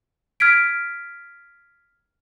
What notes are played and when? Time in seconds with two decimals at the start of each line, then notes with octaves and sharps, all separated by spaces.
0.40 F6 G#6 B6 D7